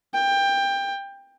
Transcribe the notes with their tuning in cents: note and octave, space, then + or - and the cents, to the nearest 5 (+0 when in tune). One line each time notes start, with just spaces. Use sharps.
G5 +20